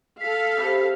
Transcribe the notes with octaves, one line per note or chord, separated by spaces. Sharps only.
A4 F5 B6
C3 A5 B5